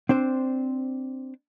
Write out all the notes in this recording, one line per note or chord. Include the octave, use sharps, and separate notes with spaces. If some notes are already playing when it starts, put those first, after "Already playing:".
C4 D4 C5